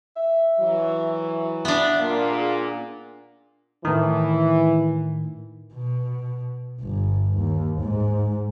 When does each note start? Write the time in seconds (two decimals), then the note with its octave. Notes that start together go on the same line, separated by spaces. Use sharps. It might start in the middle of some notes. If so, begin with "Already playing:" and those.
0.17 E5
0.59 E3 F#3
1.65 B3 D4 E5
1.99 A#2 A#3 F5
2.31 G#4
3.85 A2 D#3 E3
5.74 B2
6.81 G1
7.38 D#2
7.81 G#2